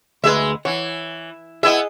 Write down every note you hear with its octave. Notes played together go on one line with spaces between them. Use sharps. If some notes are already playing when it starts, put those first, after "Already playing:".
D2 G#3 G#4 B4 E5
E3 C#5 F#5
B3 E4 G#4 D#5 E5